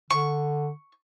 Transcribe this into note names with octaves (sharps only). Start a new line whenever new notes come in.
D3 C#6